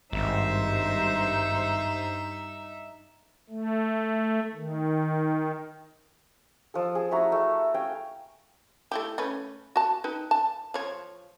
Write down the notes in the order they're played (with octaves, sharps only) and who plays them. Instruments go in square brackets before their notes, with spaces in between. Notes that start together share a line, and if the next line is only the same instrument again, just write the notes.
[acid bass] G#1 [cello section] G2 C5 [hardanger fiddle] D#4 E5
[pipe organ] A3
D#3
[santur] F3 A4
G#4
A3 E4 F#4 A#5
A3
F5 G5 G#5
[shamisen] A3 E4 G4
A3 C#4 B4
F#4 A5
D#4 B4 G5
A5
F3 C#5